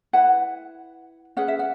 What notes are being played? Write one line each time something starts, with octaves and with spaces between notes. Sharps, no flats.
E4 B4 F#5
C#4 G#4 B4 F#5
E5
F#5